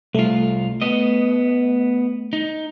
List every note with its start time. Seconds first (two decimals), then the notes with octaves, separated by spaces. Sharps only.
0.15 C2 A3 F4
0.82 B3 D#5
2.33 D#4